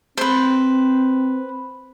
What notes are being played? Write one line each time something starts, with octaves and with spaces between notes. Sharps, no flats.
C4 B4 C5